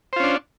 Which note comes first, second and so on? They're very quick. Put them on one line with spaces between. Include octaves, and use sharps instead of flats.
C5 F4 C#4 D4